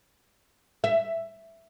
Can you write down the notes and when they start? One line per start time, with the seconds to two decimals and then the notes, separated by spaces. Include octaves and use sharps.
0.84 E5